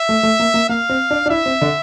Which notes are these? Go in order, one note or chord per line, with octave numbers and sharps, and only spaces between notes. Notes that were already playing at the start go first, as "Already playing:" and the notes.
Already playing: E5
A3
A3
A#3
A#3
A#3 F5
C4
D4
D4
E4 E5
C4
D3